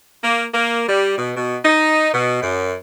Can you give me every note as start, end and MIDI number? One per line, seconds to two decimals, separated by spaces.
0.24 0.45 58
0.54 0.85 58
0.89 1.16 55
1.18 1.33 47
1.37 1.57 47
1.65 2.10 63
2.14 2.40 47
2.43 2.75 42